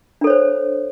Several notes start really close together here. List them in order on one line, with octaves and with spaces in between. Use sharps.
D4 A4 C#5 C5